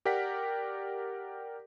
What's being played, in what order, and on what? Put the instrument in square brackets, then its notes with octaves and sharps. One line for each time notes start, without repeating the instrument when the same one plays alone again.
[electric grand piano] G4 A#4 D5 F#5 G5 B6